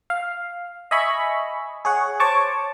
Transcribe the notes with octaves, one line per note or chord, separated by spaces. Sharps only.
F5
D#5 E5 G#5 B5 C#6
G#4 C#5 F#5
C5 C#5 A5 C#6 D6